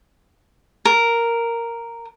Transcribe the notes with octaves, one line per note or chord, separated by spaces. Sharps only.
A#4